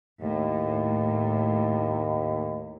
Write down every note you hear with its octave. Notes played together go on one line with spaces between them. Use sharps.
D#2 A2